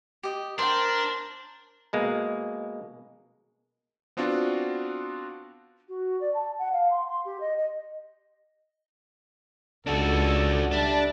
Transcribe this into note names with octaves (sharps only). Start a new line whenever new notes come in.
G4 D#5
D4 A#4 C5 G5
B2 G#3 A#3
B3 C4 D4 F4 F#4
F#4
D5
A5
F#5
F5
C6
C6
G4
D#5
D#5
C#2 D4 F#4 A4
G3 D4 E5 A5